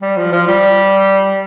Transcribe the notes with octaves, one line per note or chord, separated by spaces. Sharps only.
G3
F3
F3
G3